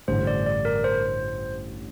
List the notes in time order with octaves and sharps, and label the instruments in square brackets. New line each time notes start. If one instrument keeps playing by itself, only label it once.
[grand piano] A1 G2 D3 [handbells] C5
[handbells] D5
D5
A#4
C5